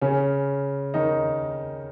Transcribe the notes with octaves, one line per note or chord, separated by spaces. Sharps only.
C#3 C#4
D#3 D#4